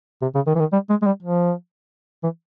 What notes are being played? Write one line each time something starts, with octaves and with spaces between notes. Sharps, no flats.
C3
C#3
D#3
E3
D#3
G3
G#3
G#3
G3
F3
E3